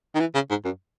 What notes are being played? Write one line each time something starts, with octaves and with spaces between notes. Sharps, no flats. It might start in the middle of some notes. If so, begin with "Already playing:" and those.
D#3
E3
C#3
G#2
F#2